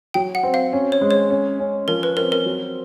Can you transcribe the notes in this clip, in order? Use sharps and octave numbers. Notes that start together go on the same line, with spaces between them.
F#3 G5
F#5
C4
F5
C#4
C#5
G#3
C#5
C#4
C#4
F3 A#4
B4
C4 A#4
A#4
F#3